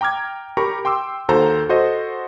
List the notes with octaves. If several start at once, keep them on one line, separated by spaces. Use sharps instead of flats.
G5 A#5 D6 F6 G#6
G4 A#4 A#5 B5 C#6
G5 C6 D6 E6
D#2 F#4 A4 C5 A#5 G6
F#4 A4 C5 D#5